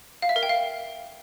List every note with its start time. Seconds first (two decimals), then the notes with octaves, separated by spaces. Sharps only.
0.22 F5
0.29 E5
0.36 A#4
0.43 G5
0.49 F5